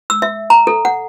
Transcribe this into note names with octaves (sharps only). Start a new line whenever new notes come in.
E6
E5
A#5
A4
F#5